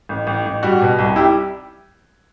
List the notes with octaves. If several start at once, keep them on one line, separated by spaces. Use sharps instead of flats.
A1
A1
A1
G3 F#4
B2
C2
G3 E4 G4